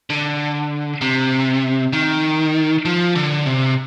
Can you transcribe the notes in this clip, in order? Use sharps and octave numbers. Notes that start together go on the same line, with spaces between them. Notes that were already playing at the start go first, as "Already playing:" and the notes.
D3
C3
D#3
F3
D3
C3